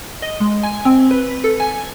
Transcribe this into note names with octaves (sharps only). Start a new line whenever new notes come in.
D#5
G#3
G#5
C4
B4
A4
G#5